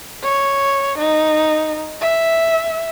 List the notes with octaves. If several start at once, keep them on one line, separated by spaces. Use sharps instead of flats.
C#5
D#4
E5